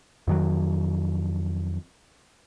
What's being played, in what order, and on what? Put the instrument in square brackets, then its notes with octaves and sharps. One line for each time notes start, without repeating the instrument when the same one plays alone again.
[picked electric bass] F2 D#3 F#3